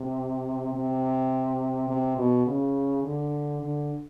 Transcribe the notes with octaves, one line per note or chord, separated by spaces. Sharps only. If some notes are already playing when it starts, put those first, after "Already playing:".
Already playing: C3
C3
C3
B2
C#3
D3
D3